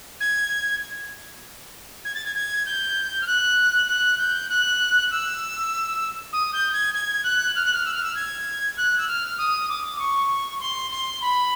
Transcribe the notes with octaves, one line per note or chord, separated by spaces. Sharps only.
G#6
G#6
A6
G#6
G#6
G6
F6
F#6
F#6
G6
F#6
E6
D#6
G6
G#6
G#6
F#6
F6
F#6
F6
E6
F6
E6
G#6
F#6
E6
F6
D#6
D6
C#6
C6
C6
B5